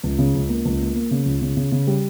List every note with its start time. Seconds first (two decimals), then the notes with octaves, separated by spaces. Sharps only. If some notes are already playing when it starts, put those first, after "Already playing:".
0.03 C#2
0.19 C#3
0.34 C#2
0.49 A#3
0.65 C#2
0.80 A#3
0.95 A#3
1.11 C#3
1.26 C#2
1.42 C#3
1.57 C#3
1.72 C#3
1.87 G3